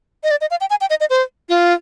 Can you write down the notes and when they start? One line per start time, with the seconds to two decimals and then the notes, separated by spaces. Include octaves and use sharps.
0.24 D#5
0.31 D5
0.41 D#5
0.51 F5
0.61 G5
0.70 G#5
0.81 G5
0.90 D#5
1.00 D#5
1.10 C5
1.49 F4